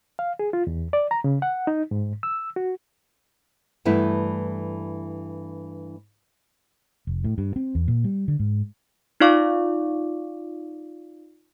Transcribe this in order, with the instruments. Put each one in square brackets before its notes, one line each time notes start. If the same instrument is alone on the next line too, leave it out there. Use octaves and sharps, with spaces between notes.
[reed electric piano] F5
G#4
F4
E2
D5
A#5
C#3
F#5
D#4
G#2
E6
F#4
[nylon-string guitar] G2 E3 A3 B3 E4
[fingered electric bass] F1
A2
G2
C4
E2
A#2
G3
D3
G#2
[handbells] D#4 F4 D5 F5 C#6 D6